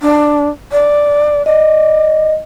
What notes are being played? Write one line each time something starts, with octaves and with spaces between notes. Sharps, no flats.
D4
D5
D5 D#5